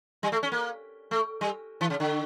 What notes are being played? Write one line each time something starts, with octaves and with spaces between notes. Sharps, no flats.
G3
A3
C#4
A#3
A3
G3
E3
C#3
D3